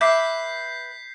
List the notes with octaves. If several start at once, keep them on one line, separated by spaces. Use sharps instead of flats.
B4 E5 D6 G6 B6 C7